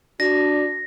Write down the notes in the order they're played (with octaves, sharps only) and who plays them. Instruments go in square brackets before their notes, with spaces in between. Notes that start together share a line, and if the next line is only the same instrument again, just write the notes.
[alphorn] D4 [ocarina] F#4 [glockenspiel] A#6